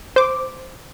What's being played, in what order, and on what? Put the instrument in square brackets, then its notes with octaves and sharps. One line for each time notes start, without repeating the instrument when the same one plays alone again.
[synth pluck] C5 D6